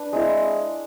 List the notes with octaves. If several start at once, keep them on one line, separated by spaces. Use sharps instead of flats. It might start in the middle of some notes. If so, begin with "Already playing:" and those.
Already playing: D4 B4
G#3 C4 E4